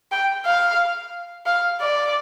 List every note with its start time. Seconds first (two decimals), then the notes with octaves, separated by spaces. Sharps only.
0.12 G5
0.46 F5
1.46 F5
1.81 D5